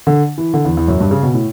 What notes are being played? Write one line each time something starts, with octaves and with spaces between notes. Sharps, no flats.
D3
E3
D3
E2
E2
F#2
G2
C#3
B2
A2